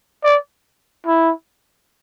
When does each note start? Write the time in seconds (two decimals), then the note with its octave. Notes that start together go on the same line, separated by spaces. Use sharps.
0.24 D5
1.06 E4